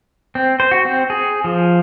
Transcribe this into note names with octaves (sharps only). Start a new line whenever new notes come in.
C4
C5
F#4
C4
G#4
F3